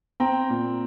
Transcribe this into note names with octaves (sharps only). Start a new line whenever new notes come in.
C4 G5 A#5
A#2